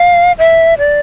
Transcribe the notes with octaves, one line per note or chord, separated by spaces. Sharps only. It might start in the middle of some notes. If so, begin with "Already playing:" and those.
Already playing: F5
E5
D5